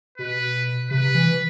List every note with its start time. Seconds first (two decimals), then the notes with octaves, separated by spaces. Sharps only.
0.18 B2 B4
0.90 C3 B4
1.14 E3